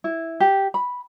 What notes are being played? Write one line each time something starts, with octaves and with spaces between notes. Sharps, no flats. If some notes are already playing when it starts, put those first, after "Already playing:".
E4
G4
B5